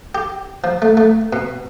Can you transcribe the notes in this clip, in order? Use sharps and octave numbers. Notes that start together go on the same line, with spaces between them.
G4
F3
A3
A3
B2